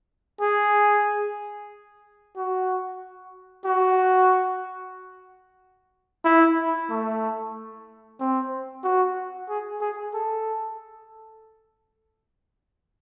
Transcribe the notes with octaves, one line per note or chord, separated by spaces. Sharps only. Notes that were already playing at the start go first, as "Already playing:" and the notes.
G#4
F#4
F#4
E4
A3
C4
F#4
G#4
G#4
A4